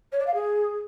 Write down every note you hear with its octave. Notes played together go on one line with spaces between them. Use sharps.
C#5
D5
F5
G#4